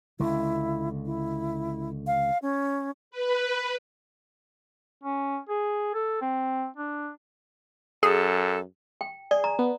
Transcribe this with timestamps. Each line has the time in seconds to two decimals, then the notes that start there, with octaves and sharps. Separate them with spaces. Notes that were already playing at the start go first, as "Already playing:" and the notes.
0.19 C#2 D3 E4
1.06 E4
2.07 F5
2.42 C#4
3.11 B4
5.04 C#4
5.49 G#4
5.94 A4
6.21 C4
6.77 D4
8.03 F#2 G#4 A4
9.01 G5
9.31 G#4 D5
9.44 A#5
9.59 B3